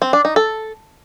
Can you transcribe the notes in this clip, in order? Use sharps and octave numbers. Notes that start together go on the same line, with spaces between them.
C4
D4
D#4
A4